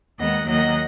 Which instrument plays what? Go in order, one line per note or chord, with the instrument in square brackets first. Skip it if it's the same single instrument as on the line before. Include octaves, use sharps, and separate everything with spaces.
[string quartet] D#2 D#3 G#3 B3 D#5 F#5
D#2 D#3 F#3 A#3 D#5 F#5